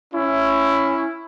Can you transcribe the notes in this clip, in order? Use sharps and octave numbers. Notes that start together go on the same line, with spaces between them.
C#4 E4